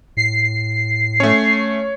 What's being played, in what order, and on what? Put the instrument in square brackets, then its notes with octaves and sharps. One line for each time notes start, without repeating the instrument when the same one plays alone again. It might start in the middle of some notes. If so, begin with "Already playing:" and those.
[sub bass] A2 [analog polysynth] C7
[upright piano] A3 C#4 [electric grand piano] C#5